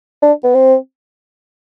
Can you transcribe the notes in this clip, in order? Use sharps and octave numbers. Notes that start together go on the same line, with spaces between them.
D4
B3
C4